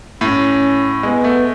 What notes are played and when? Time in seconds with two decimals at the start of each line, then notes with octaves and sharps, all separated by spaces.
0.21 A2 C#4
1.03 G#3 B3
1.24 A3